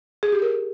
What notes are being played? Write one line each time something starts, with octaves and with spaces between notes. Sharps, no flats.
G#4
G4
A#4